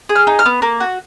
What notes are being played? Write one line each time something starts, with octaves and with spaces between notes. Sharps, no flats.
G#4
F6
D#4
F6
B3
A#3
F#4